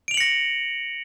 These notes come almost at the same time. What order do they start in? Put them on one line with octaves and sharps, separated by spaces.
D7 F7 F#7 C#7 A#6